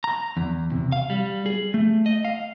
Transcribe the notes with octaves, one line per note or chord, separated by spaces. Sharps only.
A#5
E2
C3
F5
G3
G#4
A3
D#5
F5